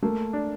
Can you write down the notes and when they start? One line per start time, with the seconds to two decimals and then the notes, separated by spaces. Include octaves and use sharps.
0.02 A3 A#3
0.33 D4